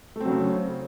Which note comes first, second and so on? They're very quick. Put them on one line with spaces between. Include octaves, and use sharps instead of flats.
A3 C4 F#3 C#3